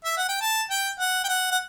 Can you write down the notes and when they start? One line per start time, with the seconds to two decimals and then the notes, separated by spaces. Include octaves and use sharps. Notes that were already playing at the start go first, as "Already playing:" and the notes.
0.05 E5
0.17 F#5
0.29 G5
0.41 A5
0.70 G5
0.99 F#5
1.24 G5
1.28 F#5
1.51 F#5